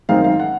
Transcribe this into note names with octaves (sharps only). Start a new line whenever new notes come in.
F#2 D#3 G#3 C4 D#4 F5
F5
F#5